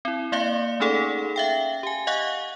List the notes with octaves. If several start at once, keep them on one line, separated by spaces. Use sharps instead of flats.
C4 E4
A#3 D5 E5 F5 C6 C#7
A3 C#4 D#4 G#4 A4 F#5
E5 F5 G5
G4 G#5
D#5 F5 F#5 C#6 F#6